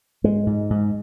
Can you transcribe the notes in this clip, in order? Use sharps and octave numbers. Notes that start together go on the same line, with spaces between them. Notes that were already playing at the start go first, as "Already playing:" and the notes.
G#2 G#3
G#2
G#2